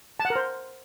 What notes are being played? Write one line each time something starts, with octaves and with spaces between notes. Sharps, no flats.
A5
F#5
A#4
C5